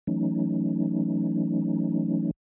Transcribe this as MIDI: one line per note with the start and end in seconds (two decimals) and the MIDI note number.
0.07 2.31 52
0.07 2.31 54
0.07 2.31 57
0.07 2.31 61
0.07 2.31 63